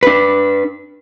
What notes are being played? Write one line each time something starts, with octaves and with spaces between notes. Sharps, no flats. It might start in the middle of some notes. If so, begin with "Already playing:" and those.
D4 B4